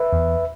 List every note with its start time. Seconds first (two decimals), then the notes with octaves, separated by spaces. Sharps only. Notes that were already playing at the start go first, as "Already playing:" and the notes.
Already playing: B4 E5
0.13 E2